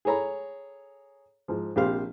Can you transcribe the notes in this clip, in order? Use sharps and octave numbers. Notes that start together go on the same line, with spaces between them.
G#4 A4 C#5 A#5 B5
G#2 F3
A#1 C3 G4 C5 F5